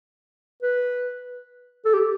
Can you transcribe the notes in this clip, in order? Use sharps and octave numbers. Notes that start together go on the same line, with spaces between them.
B4
A4
G4